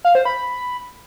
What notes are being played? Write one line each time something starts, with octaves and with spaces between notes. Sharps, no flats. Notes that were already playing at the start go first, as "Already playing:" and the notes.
F5
C5
B5